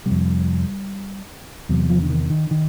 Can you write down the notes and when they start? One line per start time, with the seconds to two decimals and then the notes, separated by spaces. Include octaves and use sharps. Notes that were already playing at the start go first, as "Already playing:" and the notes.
0.06 F2 C3 G3
1.69 E2 C3 F#3
1.90 F3
2.02 D3
2.10 D#3
2.30 D#3
2.51 D#3